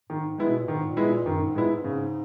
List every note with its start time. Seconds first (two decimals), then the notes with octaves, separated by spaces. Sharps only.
0.09 G#2 D#3
0.38 G#3 B3 E4
0.49 B2
0.59 A#2
0.67 G#2 D#3
0.87 A#2
0.97 G#3 B3 E4
1.07 A#2
1.25 F#2 D#3
1.45 G#2
1.55 A#2 G#3 B3 E4
1.65 G#2
1.84 G#2 C#3